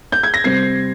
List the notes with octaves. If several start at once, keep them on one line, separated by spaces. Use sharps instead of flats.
G6
G#6
A#6
C3 G3 C4 G#6 C7